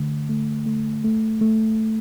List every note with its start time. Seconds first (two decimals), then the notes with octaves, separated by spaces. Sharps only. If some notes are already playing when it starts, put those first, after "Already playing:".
Already playing: D3 A3
0.29 A3
0.66 A3
1.04 A3
1.41 A3